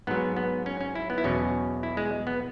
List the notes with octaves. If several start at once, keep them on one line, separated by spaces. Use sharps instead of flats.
G#2 F#3 B3
B3
C#4
C#4
E4
B3
E4
E2 B2 F#3 C#4
E4
G#3
B3